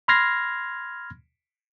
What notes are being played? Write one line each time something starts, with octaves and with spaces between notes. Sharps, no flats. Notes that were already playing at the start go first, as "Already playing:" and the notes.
B5 C6 F6 G#6 A#6 C7